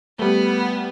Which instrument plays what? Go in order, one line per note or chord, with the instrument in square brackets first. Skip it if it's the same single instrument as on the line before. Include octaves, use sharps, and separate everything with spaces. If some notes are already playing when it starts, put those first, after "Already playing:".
[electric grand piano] G3 A3 [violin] B3